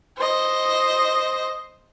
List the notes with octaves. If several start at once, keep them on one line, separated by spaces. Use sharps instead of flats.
C5 D#5